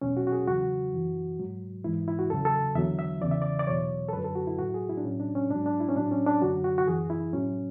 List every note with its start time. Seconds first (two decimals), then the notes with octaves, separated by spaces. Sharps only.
0.02 E2 B2 F#3 C#4
0.17 F#4
0.27 F#4
0.32 G#4
0.47 E2 C#3 F#3 F#4
0.93 F#2 E3
1.39 G#2 F#3
1.84 G#2 E3 E4
2.08 E4
2.19 F#4
2.30 E2 C#3 F#3 A4
2.45 A4
2.75 E2 D3 F#3 E5
2.99 E5
3.21 E2 C#3 E3 D5
3.31 E5
3.42 D5
3.59 D5
3.67 E2 B2 F#3 C#5
4.09 A4
4.13 F#2 D3 F#3 B4
4.25 A4
4.35 F#4
4.47 E4
4.58 A2 F#3 F#4
4.74 G#4
4.89 E4
4.97 D4
5.04 A2 F#3 C#4
5.20 D4
5.35 C#4
5.50 G#2 F#3 D4
5.66 D4
5.80 E4
5.89 C#4
5.96 A2 F#3 D4
6.11 C#4
6.27 D4
6.41 F#2 D3 F#3 F#4
6.64 F#4
6.78 F#4
6.87 F#2 E3 G#4
7.10 E4
7.33 A2 F#3 C#4